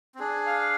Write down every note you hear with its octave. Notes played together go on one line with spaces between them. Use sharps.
C4
D4 G#4
F5